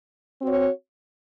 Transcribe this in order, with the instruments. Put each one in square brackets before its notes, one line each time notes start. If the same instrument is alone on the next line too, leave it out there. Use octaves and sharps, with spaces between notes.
[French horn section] C4 F#4 C#5